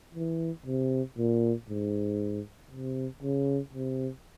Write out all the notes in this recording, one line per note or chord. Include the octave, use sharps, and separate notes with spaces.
E3
C3
A#2
G#2
C3
C#3
C3